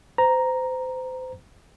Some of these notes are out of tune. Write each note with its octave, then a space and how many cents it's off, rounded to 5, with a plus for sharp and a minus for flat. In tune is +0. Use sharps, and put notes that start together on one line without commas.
C5 -30 A#5 +0